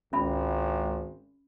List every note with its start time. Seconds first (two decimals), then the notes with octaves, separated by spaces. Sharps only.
0.13 G#1 C#2 C#4 E5 B5